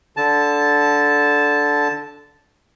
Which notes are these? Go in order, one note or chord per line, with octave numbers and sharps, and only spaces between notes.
D3 A5